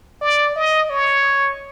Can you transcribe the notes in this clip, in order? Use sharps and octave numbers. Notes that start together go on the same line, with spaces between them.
D5
D#5
C#5